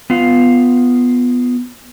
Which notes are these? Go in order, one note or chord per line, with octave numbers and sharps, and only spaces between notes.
B3 F4 F5